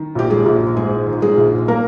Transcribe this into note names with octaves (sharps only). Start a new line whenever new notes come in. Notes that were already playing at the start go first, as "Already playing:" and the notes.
Already playing: D#3
A#1 G4
G#3 G#4
A#1
G#2 G#3 G#4
D#3
G#3 G#4
A#1
A#3 A#4